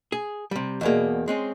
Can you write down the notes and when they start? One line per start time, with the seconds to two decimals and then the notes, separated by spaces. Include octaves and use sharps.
0.12 G#4
0.51 C3 G3
0.81 E2 B2 A#3 G#4 D5 D#5
1.28 G#3 C4 C#4